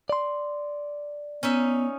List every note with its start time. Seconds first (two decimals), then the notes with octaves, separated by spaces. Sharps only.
0.10 D5 C6
1.43 B3 C#4 D#4 E5